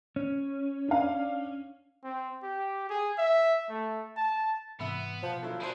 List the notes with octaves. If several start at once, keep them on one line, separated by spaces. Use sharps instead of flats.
C#4
D4 F5
C4
G4
G#4
E5
A3
A5
G#2 C3 E3 B3 E5 B5
B2 F3 C5 A5
D3 F#3 E4
D4 E4 F#4 G#4 C5 B5 C6